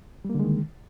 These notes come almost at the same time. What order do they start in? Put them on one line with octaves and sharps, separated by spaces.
G3 A#3 D3 G#3 D#3